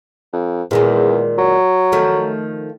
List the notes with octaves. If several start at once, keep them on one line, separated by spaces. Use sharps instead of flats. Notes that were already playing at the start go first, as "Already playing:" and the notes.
F2
E2 A#2 D#3 G#3
F#3
D#3 F3 A3